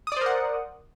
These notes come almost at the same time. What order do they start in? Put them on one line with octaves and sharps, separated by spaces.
D#6 D5 C5 A#4 F#5